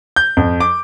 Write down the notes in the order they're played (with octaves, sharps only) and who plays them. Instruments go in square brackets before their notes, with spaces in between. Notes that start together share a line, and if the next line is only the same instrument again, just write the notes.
[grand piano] G6
F2
D6